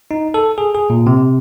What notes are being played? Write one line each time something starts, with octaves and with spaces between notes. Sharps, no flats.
D#4
A4
G#4
G#4
A#2
C3